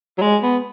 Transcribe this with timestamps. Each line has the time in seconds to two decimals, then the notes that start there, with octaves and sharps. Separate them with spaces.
0.18 F#3
0.22 G#3
0.43 B3